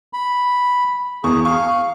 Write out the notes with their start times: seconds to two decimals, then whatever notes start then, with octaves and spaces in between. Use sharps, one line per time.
0.13 B5
1.24 E2 G#4 C#6
1.45 F5 C#6